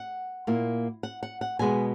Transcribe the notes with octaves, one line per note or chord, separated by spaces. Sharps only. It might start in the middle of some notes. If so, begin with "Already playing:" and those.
Already playing: F#5
A#2 A#3 E4
F#5
F#5
F#5
B2 G#3 B3 G#5